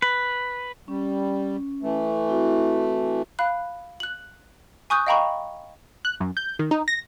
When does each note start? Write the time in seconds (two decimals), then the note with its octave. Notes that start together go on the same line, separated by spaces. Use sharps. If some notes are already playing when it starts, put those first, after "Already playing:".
0.02 B4
0.88 G3 C#4
1.83 E3 A3
2.29 C4 E4 F#4
3.39 F5 B5 F#6
4.00 F#6 F#7
4.90 G#5 C#6 D#6 F#6 G6
5.07 D#5 F5 G5 A#5 B5 C#6
6.05 F#6
6.20 F#2
6.37 G6
6.59 D#3
6.71 D#4
6.88 A#6